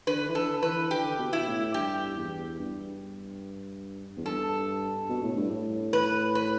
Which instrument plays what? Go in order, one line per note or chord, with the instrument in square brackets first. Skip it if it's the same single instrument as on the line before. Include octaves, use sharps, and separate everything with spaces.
[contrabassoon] D3 [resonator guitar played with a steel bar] B4
[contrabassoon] E3
[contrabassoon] D3 [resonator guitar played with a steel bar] A4
[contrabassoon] E3 [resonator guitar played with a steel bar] B4
[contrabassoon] D3 [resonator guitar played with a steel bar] G4
[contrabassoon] B2
[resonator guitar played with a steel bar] E4
[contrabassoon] A2
[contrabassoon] G2 [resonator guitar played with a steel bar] G4
[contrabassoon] E2
G2
E2
[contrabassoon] G2 [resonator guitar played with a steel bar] A4
[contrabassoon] B2
A2
G2
A2
[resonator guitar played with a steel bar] B4
B4